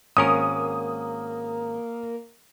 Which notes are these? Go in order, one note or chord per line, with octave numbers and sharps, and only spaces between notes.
G#1 A#3 C#4 A#4 D#6